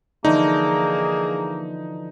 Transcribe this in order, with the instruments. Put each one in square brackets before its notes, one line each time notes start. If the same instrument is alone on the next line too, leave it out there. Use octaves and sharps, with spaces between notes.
[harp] D3 E3 F3 [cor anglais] A#3 [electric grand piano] D#4 [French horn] G#4